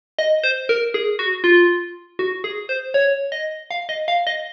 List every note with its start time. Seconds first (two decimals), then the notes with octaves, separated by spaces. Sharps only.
0.19 D#5
0.43 C5
0.69 A#4
0.94 G#4
1.19 F#4
1.44 F4
2.19 F#4
2.44 G#4
2.69 C5
2.94 C#5
3.32 D#5
3.71 F5
3.89 D#5
4.08 F5
4.27 D#5